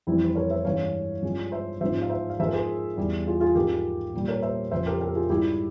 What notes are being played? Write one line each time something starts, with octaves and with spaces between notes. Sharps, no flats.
F2 E3 G3 C4 E4
C5
A#4 C#5
C5 E5
G2 E3 G#3 C#5 F5
G2 F3 G#3
C5 E5
G#2 F3 G#3 C5 E5
F5
C5 E5
F5
G#2 F3 G#3 C5 E5
A#4
G#4 C5
E2 E3 G3
F4 G#4
F4 G#4
G#2 F3 G#3 G4 A#4
A#2 G3
A#4 C#5
C5 E5
F2 C#3 F3 C5 E5
G4 A#4
G4 A#4
F4 G#4
G#2 G3 E4 G4